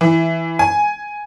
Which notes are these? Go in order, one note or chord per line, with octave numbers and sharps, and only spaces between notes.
E3
G#5